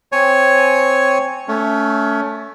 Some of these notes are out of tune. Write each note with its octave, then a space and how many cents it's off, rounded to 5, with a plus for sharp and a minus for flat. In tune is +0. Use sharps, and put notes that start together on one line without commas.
C4 -5 C#5 +0 G#5 +0
A3 +5 C#4 +25